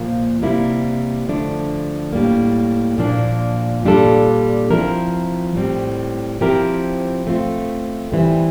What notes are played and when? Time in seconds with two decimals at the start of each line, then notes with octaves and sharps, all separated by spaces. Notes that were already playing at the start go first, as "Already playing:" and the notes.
Already playing: A#2 F3 A#3
0.41 C3 G3 A#3 E4
1.28 D3 F3 A3 D4
2.13 A2 G3 A#3
2.98 A#2 F3 A#3 D4
3.85 A#2 G3 D4 F4 A4
4.71 F3 C4 E4 A#4
5.56 A2 G3 C4
6.41 F3 C4 E4 G4 A#4
7.27 A3 C4 F4
8.12 E3 G3 C4